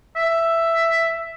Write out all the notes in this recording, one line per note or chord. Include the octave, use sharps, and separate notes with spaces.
E5